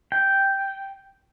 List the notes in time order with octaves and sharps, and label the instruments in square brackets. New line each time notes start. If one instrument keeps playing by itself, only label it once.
[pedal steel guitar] G5